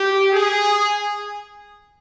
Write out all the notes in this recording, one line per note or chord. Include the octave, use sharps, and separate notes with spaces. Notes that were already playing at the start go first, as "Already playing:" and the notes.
Already playing: G4
G#4